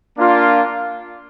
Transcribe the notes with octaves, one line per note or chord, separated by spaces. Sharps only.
A#3 D4 F4